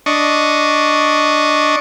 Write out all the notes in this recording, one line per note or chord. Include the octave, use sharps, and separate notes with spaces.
D4 D#5 C#6